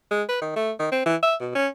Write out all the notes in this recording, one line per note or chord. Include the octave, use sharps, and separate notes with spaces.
G#3
B4
D#3
A3
D#3
C4
E3
E5
B2
C#4